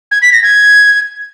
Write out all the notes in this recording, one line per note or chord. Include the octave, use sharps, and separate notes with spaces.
G#6
B6
A#6
G#6